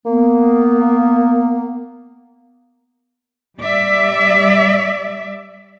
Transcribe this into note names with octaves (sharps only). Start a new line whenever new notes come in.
A#3 B3
G3 D5 E5